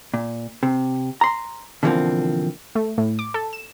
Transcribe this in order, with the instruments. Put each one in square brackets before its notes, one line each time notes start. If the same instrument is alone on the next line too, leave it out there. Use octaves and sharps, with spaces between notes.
[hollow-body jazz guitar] A#2
C3
A#5 C6
B2 D3 E3 F3 A#3 C4
[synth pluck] A3
A2
D6
A4
E7